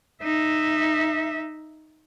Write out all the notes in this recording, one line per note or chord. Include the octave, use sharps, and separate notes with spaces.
D#4 E5